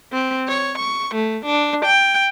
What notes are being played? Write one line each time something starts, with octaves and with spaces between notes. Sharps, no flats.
C4
C#5
C#6
A3
D4
G5